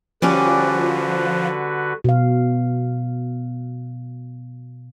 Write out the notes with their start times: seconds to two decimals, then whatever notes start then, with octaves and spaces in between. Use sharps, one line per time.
0.22 D3 F3 G3 C#4 F#4 B4 D5
2.04 B2 F5